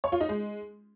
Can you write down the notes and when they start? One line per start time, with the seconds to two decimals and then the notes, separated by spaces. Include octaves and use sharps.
0.04 C#5
0.12 F4
0.21 D#4
0.29 G#3